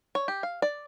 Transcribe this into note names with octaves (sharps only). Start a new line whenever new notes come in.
C#5
G4
F5
D5